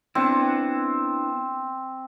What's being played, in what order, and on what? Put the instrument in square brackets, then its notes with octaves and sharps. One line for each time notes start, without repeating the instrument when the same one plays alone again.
[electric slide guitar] B3 D4 E4 [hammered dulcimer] C4